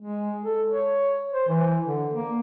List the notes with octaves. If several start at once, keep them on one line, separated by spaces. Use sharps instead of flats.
G#3
A4
C#5
C5
E3
D3
A#3